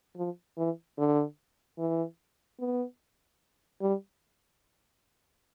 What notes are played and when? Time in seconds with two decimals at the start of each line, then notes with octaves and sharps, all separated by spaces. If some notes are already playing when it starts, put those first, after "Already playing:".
0.17 F3
0.57 E3
0.98 D3
1.79 E3
2.60 B3
3.81 G3